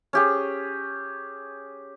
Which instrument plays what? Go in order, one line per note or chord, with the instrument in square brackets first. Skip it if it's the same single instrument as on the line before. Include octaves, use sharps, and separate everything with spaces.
[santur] C#4 G4 G#4